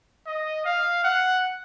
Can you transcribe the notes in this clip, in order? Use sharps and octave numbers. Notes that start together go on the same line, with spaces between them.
D#5
F5
F#5